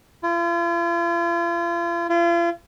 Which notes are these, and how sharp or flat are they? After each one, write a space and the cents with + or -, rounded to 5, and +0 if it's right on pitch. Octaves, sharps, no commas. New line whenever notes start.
F4 -40
F4 -40